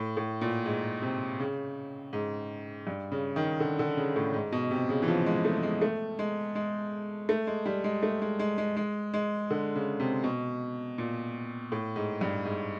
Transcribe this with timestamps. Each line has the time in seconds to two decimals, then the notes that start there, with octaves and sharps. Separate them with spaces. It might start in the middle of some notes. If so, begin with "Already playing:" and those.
Already playing: A2
0.17 A2
0.41 A#2
0.66 G#2
1.02 C3
1.40 C#3
2.13 G#2
2.87 G2
3.12 C#3
3.36 D#3
3.60 D3
3.79 D3
3.97 C#3
4.16 A2
4.34 G#2
4.52 B2
4.71 C3
4.89 C#3
5.02 E3
5.08 F3
5.26 G#3
5.45 A3
5.63 G#3
5.82 A3
6.19 G#3
6.55 G#3
7.29 A3
7.47 G#3
7.66 G3
7.84 G#3
8.03 A3
8.22 G#3
8.39 G#3
8.58 G#3
8.77 G#3
9.14 G#3
9.50 D3
9.75 C#3
10.00 C3
10.24 B2
10.98 A#2
11.72 A2
11.96 G#2
12.21 G2
12.45 G#2